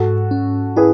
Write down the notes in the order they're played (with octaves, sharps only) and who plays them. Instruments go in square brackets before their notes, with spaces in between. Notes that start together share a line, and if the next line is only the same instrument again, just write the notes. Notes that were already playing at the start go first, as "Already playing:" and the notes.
Already playing: [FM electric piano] G#2 [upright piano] F#4 A4
[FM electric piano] C#4
[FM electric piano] E4 [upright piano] G#4 B4